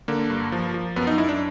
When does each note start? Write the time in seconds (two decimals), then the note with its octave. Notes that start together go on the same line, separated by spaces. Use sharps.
0.08 D3 A#3
0.30 G2
0.52 F3
0.74 F3
0.96 F#2 B3
1.07 D#4
1.18 F#2 E4
1.29 D4